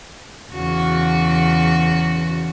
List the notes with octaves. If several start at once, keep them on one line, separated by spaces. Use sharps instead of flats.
E2 C#3 F#4